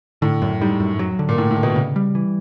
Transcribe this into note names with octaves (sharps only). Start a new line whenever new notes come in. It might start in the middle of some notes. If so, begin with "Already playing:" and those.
A2 D3
F#2
G#2 G3
F#2
F#3
D3
A#2
A2 A3
A2
D3
B2
C#3
G3
E3